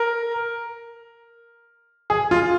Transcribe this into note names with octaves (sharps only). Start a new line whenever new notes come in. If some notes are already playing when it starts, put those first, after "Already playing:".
Already playing: A#4
G#4
F4